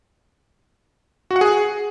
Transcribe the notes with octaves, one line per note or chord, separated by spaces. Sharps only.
F#4
F#5
G#4